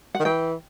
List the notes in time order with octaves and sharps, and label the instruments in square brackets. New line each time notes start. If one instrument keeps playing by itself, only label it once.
[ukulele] F#5
[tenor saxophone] D#3
[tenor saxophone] E3 [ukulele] G5